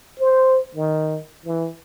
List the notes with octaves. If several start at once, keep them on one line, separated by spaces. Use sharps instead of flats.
C5
D#3
E3